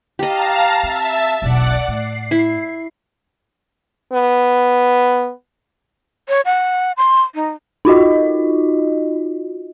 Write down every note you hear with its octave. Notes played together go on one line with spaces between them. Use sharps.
G4 D#5 F5 A5 A#5
C4 E5 A5
E1 B1 D5 F#5
A2 C7
E4
B3
C#5
F#5
C6
D#4
D#4 F4 F#4 D#5